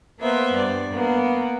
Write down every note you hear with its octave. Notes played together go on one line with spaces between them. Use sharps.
A#3 B3 C5 E5
G2 D5
A#3 B3